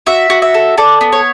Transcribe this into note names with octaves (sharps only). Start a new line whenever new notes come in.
F#4 E5
F#4
E5
A4
A4 D5
B3
C#5